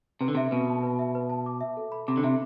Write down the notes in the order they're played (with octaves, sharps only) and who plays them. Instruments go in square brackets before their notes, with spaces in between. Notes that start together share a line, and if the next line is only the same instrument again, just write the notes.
[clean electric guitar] C3 [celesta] B4
[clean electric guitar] D3
[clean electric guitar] C3 [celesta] E5
[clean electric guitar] B2 [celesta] B4
[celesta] A5
B4
E5
B4
A5
D6
E5
A4
B5
[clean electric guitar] C3 [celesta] D6
[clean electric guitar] D3
[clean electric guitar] C3 [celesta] E5